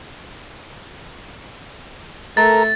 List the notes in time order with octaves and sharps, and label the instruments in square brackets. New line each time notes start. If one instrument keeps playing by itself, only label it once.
[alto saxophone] A3 [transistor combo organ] A4 A#4 A#5 [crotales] A6